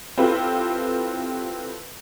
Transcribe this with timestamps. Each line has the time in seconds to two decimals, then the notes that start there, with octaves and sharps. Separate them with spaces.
0.18 C4 E4 F4 G4 A4 B4